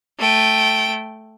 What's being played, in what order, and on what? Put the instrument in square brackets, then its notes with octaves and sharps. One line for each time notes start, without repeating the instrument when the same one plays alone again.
[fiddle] A3 G5